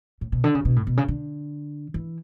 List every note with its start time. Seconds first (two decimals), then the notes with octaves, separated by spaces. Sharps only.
0.21 A2
0.32 B2
0.44 D3
0.55 C#3
0.65 B2
0.76 A2
0.87 B2
0.97 C#3
1.08 D3
1.94 E3